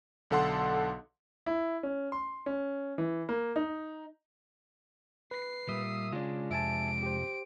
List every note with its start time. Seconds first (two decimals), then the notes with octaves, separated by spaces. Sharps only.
0.30 B1 D3 A4 F#5 C6
1.46 E4
1.83 C#4
2.12 C6
2.46 C#4
2.98 E3
3.29 A#3
3.56 D#4
5.31 B4 C7
5.69 A#2 G3 E5 D#6
6.13 C#3 G#3 D4 F4 D5
6.51 F2 C3 E5 G#5 A5 D7
7.03 G4 C5